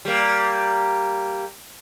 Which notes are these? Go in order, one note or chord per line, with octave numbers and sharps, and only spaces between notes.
G3 A#3